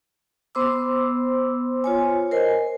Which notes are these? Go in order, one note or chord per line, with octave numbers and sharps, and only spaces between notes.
B3 C5 C6 D6 E6
F4 C#5 G#5
A#4 C5 D#5 G#5